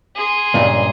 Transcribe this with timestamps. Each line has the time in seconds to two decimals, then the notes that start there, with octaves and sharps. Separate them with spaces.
0.15 G#4 C6
0.54 C#2 G2 A#2